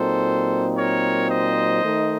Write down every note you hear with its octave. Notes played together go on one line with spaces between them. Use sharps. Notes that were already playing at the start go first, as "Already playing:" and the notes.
Already playing: A#2 F#3 C4 D#4 A4 C5
A#4 C#5
C5 D#5
D#3 A3 D#4